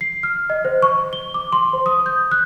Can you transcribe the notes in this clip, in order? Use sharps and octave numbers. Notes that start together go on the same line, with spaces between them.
C7
F6
D#5
C5
C#6
G7
D6
C6
C5
D#6
G6
F#6